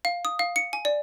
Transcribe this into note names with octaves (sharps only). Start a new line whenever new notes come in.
F5
D#6
F5
C#7
G#5
D5